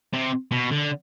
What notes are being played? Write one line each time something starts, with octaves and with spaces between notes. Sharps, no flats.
C3
B2
D3